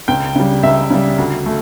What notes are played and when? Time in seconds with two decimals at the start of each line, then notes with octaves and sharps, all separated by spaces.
0.08 C#2 G5
0.36 C#3 G3
0.63 C#2 E5
0.90 C#3 G3
1.18 D2
1.46 A3